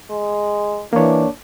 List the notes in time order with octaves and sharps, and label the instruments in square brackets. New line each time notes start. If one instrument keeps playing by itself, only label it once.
[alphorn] G#3
[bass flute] E3 [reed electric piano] A#3 C#5 [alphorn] D4